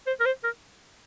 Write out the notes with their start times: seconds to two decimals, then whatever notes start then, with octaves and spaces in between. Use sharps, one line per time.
0.06 C5
0.20 A#4
0.25 C5
0.43 A#4